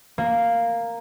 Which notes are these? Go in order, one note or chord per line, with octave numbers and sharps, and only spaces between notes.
A#3